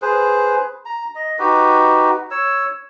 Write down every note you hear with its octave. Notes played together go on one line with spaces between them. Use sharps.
G#4 B4 C5
A#5
D#5
D#4 F#4 G4 B4
C#5 E6